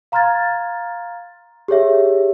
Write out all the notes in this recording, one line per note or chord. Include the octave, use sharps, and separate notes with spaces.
F5 A#5 C6 F6 G#6 A6
G4 G#4 C#5 E5